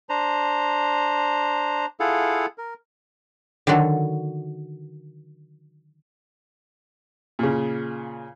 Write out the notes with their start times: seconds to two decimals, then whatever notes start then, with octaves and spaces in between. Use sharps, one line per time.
0.09 D4 C5 A#5
2.00 E4 F4 G#4 A4 F5 F#5
2.58 A#4
3.67 D3 D#3 F#3 F#4 A4
7.39 A#2 C#3